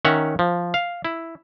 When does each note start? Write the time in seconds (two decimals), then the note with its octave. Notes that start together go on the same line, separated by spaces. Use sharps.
0.05 D#3 C#4 E5 F#5 A#5
0.39 F3
0.74 F5
1.05 E4